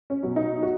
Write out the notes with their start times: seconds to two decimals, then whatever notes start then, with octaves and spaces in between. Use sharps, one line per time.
0.10 C#4
0.23 B2 F#3
0.36 D#4
0.63 F#4